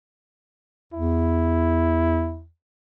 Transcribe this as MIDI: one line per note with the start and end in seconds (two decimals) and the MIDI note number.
0.93 2.48 40
0.93 2.41 64